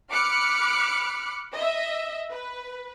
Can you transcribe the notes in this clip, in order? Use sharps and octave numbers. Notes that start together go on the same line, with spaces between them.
B5 D6 F6 F#6 C#7
D#5 E5
B4